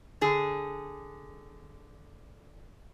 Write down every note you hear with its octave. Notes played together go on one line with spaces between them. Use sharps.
D3 G#4